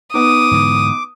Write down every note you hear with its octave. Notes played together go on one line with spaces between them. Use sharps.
B3 D#4 D6 D#6
G#2 D3 E3